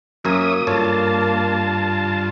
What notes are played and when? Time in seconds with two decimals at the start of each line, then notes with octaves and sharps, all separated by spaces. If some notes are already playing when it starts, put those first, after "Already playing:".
0.25 F#2 A#3 A#4 C#5 E5 G#5 D#6
0.67 G2 F4 A4 C#5 A5